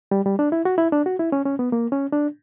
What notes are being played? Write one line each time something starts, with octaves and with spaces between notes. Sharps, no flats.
G3
G3
D4
E4
F#4
E4
D4
F#4
E4
C#4
C#4
B3
A#3
C#4
D4